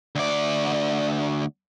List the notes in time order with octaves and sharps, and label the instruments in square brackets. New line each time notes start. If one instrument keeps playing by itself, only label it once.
[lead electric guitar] D2 D5